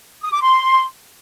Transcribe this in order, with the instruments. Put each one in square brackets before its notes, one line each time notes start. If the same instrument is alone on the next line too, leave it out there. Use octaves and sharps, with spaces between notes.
[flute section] D#6
D6
C6